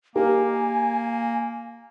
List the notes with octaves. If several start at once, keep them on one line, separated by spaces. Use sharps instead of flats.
A#3 D#4 G4 A#4 G#5